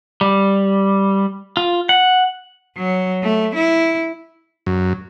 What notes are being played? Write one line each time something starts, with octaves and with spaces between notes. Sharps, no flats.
G3
F4
F#5
F#3
A3
E4
F#2